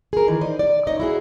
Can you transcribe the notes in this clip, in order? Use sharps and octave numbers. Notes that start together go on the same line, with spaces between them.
G#4 A#4
D#3 E3
D#4 C5 D5
D5
D#4 C#5 D#5
E4 F#4 G#4